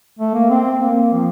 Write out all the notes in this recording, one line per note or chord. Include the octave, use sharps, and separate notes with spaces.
A3
A#3
C4
A#3
F3